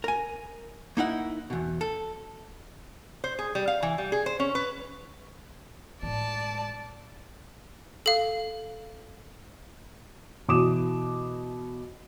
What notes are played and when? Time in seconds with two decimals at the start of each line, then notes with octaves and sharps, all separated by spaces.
0.04 A#4 G#5
0.97 A#3 D#4 E4 F#5
1.50 E2 B2
1.81 A4
3.24 C5
3.39 G#4
3.55 G3
3.68 F5
3.83 E3
3.98 G3
4.12 G#4
4.26 C5
4.40 C#4
4.55 B4
6.02 A2 G#3 D5 A5
8.06 A4 F5
10.48 B2 E3 D6 D#6 E7